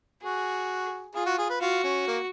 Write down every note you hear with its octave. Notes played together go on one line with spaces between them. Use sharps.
F#4 G#4
F4 G#4
F#4
G#4
B4
F4 F#4
C#4
A#3